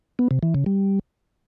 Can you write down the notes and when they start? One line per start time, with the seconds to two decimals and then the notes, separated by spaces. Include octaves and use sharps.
0.19 B3
0.31 C3
0.43 E3
0.54 C#3
0.66 G3